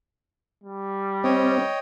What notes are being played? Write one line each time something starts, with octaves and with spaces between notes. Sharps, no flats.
G3
C4 C#5 D#5 G5